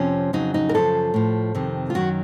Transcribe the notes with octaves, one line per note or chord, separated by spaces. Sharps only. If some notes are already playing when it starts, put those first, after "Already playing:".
Already playing: F2 C3 F3 C#4
F2 C#3 F#3 D#4
D#4
A#4
F#2 C#3 F3 A4
A2 F3
F2 C3 D#3
F4
F#2 D#3 F#3 F#4